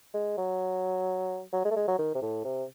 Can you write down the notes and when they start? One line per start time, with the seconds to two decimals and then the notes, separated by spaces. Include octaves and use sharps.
0.14 G#3
0.37 F#3
1.53 F#3
1.65 G#3
1.71 A3
1.76 G#3
1.87 F#3
1.99 D#3
2.15 C3
2.22 A2
2.44 C3